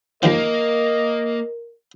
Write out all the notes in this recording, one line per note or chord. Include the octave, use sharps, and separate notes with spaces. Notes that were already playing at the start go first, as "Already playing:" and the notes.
D#2 D#3 F3 A#3 A#4 D#5